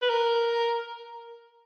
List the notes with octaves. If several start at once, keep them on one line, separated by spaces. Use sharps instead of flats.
B4
A#4